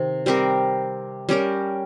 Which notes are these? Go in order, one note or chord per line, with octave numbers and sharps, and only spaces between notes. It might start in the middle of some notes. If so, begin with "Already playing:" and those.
Already playing: C3 D#3
G3 C4 G4 A#4
G3 C#4 G4 A#4